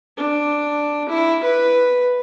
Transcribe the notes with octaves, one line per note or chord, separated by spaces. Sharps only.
D4
E4
B4